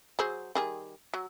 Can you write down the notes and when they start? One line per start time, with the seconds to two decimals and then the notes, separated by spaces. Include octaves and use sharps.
0.19 F#3 G#4 C5
0.55 D#3 G3 G#4
1.14 F#3